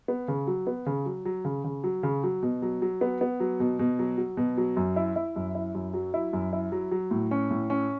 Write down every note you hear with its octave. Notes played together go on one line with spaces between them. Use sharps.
B3
C#3
F#3
B3
C#3
F#3
F#3
C#3
C#3
F#3
C#3
F#3
B2
F#3
F#3
B3
B3
F#3
B2
B2
F#3
F#3
B2
F#3
F#2
E4
E4
F#2
E4
F#2
F#3
E4
F#2
E4
F#3
F#3
A2
C#4
A2
C#4